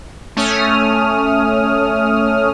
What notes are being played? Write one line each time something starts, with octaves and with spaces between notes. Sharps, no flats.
A3 C#4 C#5 D#6 F6